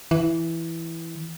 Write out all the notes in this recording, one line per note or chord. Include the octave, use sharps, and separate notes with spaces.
E3